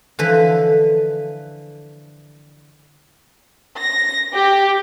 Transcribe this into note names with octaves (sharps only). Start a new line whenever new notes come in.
D3 E3 F3 B4
A#6
G4